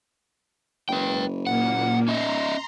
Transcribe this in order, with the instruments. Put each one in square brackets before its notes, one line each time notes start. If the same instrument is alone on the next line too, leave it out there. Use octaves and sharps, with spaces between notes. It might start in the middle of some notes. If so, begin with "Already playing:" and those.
[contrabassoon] F#1 [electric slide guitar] B4 G5
[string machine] A#2 A#3 [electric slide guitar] F#5
[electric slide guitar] C#4 D#5 E5 [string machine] A#5 C6